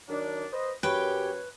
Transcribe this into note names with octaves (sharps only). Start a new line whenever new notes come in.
D#3 F#3 D4
B4 C5 D#5
F#2 G4 B4 C#5 G5